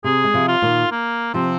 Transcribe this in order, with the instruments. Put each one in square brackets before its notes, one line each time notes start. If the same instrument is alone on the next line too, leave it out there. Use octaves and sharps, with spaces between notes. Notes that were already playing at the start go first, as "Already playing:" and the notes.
[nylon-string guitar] C3 [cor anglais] G#4
[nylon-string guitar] G#3
C3 F3
[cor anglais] F4
[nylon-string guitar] A#2 D#3
[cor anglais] A#3
[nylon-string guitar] C3 F3 [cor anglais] C4